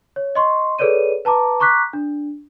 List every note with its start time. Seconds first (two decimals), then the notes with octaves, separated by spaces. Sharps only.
0.16 C#5
0.35 D#5 C6 C#6
0.79 G#4 A4 B4 C#5 D5 D#7
1.25 B4 A5 A#5 D6
1.60 A#5 C#6 D6 F#6 B6
1.93 D4